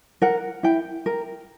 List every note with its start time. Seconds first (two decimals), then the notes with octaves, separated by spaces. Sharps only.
0.22 A#4 F#5
0.63 E4 G5
1.06 A#4